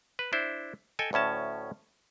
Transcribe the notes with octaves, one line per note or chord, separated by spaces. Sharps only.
B4
D4 E4 C5
A4 D#5 G5 G#5
D2 A2 C#4 A5